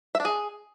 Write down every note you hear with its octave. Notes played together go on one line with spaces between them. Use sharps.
E5
D4
G#4